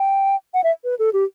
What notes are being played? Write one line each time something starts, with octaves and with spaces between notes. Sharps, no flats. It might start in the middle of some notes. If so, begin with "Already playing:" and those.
Already playing: G5
F#5
E5
B4
A4
G4